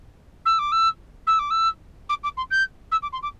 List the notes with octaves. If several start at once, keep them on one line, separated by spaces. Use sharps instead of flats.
E6
D6
E6
E6
D6
E6
D6
D6
C6
G6
E6
D6
C6
D6